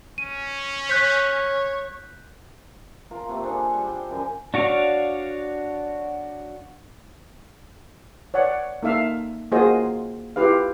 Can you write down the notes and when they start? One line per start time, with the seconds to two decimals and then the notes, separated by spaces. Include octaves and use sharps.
0.18 C#4 D#7
0.90 C#5 F#6 G6 B6
3.11 F4 A#4
3.29 C3 A3 A#3 G4
3.43 D4 G#4 A4 C5
3.74 G3
3.87 G5
4.11 F#2 G#5
4.54 D4 F#4 C#5 D5 F5
8.34 C#5 D5 F#5
8.83 A#3 D#4 A4 E5 F5
9.52 A#3 F4 F#4 G#4 C5 D#5
10.36 E4 F4 G4 B4 F5